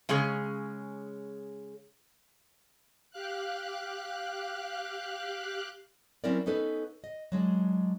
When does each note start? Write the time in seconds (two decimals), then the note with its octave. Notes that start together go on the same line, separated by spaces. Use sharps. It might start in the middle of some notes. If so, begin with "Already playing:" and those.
0.09 C#3 G#3 C#4 G#4
3.11 G4 F5 F#6
6.24 F#3 C4 C#4 E4 A#4 D5
6.46 B3 C#4 D#4 A4 B4
7.04 D#5
7.32 F#3 G#3 D4